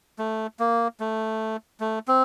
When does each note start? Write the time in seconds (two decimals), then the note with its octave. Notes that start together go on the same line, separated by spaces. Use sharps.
0.19 A3
0.59 A#3
1.00 A3
1.80 A3
2.08 C4